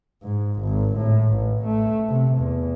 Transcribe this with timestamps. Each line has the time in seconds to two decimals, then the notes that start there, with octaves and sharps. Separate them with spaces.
0.23 G#2
0.62 G#1
0.97 A2
1.35 A1
1.65 A3
2.09 C3
2.38 E2